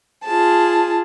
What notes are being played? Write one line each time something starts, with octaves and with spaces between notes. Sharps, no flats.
F4 G#4 A5